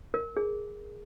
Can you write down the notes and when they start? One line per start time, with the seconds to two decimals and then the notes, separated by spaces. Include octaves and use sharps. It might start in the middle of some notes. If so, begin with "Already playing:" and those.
0.14 A#4
0.37 G#4